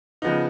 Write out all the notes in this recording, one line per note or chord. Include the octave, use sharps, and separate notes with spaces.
C#3 F3 B3 D#4